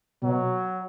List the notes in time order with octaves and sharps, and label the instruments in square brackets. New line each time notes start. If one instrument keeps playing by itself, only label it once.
[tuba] B2 [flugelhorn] F#3